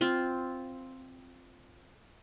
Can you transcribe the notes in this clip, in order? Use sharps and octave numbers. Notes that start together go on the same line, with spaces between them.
C4 F4